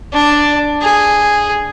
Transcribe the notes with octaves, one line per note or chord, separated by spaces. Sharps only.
D4
G#4